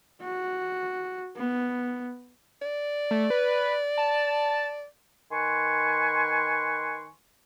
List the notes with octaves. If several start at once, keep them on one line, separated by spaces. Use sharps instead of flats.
F#4
B3
D5
A3
B4
A5
D#3 B4 G#5 C6 C#6